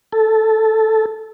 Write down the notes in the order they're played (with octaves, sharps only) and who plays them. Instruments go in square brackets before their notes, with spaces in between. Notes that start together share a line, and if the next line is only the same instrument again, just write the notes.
[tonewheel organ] A4